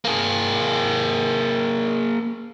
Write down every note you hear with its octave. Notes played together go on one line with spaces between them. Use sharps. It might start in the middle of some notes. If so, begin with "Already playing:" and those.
A#3 G#4